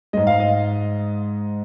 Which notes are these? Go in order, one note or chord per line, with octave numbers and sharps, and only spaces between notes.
G#2 G#3 D#5
F5
D#5